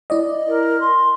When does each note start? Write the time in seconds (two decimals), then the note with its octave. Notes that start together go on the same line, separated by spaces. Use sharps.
0.10 E4 D5 D#5
0.49 A#4
0.80 C6